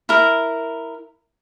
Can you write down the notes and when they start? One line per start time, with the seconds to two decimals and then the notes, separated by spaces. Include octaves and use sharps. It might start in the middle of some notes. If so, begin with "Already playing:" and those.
0.09 E4 A#4